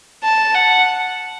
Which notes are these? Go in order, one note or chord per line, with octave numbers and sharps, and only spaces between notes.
A5
F#5